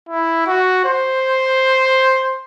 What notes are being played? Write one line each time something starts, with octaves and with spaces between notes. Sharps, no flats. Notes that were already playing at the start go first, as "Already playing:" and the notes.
E4
F#4
C5